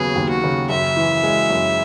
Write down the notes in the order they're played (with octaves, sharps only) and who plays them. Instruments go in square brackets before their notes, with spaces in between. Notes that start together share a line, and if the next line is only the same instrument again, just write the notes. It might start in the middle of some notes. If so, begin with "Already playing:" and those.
Already playing: [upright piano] D#2 C#3 F#3 B3 [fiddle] G#4
[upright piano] D#2
[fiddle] F#4
[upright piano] C#3
[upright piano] F#2 [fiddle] E5
[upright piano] E3
G#3
F#2